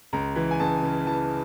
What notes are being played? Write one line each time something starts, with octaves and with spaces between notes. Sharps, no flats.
C#2 A#5
E3
G#5
C#2 A5
C#3
E3 A5